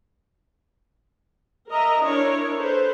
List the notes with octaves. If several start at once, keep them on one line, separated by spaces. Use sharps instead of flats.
A#4 D#5 E5 A#5
D4 E4 A#4 C#5
A4 B4 C5